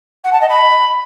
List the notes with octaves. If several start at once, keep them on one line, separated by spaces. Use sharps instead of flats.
F#5
A5
D#5
B5